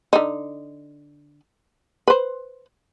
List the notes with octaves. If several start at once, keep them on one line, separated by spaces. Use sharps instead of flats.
D3 D#4
B4 C5